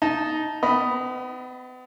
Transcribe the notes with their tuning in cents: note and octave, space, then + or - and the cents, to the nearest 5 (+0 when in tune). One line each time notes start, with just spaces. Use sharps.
D#4 +0 A5 -15
B3 +40 D#5 +0 B5 +0